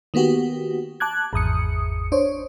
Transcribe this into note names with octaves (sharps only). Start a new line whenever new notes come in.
D#3 A#3 B3 F#4 G4
A5 D6 F#6 G#6
G#1 E2 D#6 C#7
D4 C5 C#5